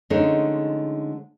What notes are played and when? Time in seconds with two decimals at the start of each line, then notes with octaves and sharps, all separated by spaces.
0.10 D3 F3 G#3 A3 C#4 D#4